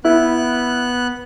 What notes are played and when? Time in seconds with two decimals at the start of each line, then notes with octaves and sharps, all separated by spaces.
0.05 B3 E4 F#6